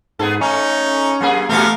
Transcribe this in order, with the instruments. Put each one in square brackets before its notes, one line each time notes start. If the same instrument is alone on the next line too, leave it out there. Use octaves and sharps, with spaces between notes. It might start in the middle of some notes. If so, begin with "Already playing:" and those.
[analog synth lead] G#2 [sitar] B3 G#4 A4
[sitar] A3 [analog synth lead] C#4 [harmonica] D#4
[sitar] F#2 A#3 G#4
[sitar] A#2 E3 G3 [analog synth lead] A3 [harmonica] A#4 F5